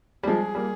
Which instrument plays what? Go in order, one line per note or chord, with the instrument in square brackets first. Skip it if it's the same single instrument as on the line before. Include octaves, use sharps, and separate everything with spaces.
[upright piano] G3
[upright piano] F3 G#3 [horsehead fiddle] G#4
[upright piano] G3 A#3